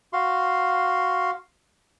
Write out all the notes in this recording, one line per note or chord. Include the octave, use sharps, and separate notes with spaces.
F#4 F5 C6